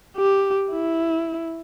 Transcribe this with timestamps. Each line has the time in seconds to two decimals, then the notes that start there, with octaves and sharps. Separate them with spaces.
0.17 G4
0.72 E4